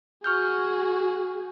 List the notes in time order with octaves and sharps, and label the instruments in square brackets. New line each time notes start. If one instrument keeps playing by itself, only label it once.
[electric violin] F#4 G#4 [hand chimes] C#6 F6 G6